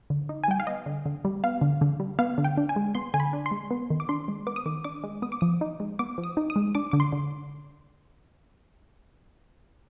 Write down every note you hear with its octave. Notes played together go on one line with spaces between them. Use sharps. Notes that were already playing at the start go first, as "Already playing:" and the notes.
D3
D#4
G#5
G3 G5
F5
B3 D#5
D3
D3
G3
B3 F5
D3
D3
G3
B3 F5
D3
G5
D4
G#5
G#3
B3 C6
D3 G#5
B5
D4
C6
G#3
B3
D#3
D6
D4 C6
G#3
B3 D6
D#6
D#3 D6
D4 D6
G#3
B3 D#6
D6
F3 D#6
D#4
G#3
B3 D6
F3
D#6
D#4
D#6
G#3
D4 D6
D3 D6
C6
D3